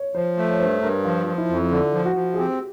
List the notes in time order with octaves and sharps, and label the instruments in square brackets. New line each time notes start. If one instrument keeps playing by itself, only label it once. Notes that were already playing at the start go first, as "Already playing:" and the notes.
Already playing: [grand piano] C#5
[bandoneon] F3 [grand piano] C5
[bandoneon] A3
[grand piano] C#5
[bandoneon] G2 [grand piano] C5
[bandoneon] G2 [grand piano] A#4
[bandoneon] F3 [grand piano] F4
[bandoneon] F3
[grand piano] E4
[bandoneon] F2
[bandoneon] D3 [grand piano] F4
[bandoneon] F3
[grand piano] F#4
[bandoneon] F3
[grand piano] G#4
[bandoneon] C4 [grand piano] G4